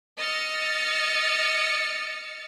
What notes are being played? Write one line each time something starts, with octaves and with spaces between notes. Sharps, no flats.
D#5 E6 F6 A6 C#7